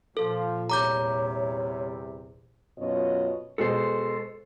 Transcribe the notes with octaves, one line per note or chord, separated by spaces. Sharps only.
A#2 F3 A4
E2 C3 G3 C#5 A#5 D6 G6
F#2 B2 F4 C#5 D#5
B2 G#3 A4 C5